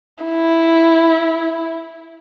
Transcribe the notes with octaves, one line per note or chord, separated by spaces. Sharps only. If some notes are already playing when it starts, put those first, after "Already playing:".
E4